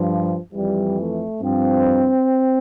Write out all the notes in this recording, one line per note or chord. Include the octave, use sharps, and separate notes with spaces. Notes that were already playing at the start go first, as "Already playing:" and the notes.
Already playing: G2 F3
F2 E3 G3
A3
G2 F3 C4